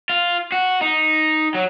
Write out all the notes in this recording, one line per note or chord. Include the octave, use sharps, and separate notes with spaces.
F4
F#4
D#4
F#3